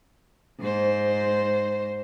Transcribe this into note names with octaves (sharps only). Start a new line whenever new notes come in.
G#2 C5